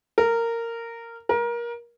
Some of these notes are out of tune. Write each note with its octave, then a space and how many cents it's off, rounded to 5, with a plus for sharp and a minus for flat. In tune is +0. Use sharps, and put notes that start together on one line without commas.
A#4 -15
A#4 +25